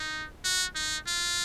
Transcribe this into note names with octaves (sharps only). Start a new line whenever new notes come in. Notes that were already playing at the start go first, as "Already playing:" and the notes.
Already playing: D#4
F#4
D#4
F4